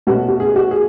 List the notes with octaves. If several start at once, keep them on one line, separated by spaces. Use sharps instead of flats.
B2 A3 C#4 F#4
F#4
G#4
F#4
G#4